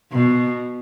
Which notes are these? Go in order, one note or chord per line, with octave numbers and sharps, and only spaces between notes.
B2